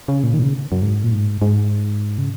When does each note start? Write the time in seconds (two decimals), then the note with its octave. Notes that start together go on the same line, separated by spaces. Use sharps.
0.08 C#3
0.23 A#2
0.34 D#3
0.39 A#2
0.43 C#3
0.72 F#2
0.82 G#2
1.04 A#2
1.12 G#2
1.42 G#2
2.18 C#3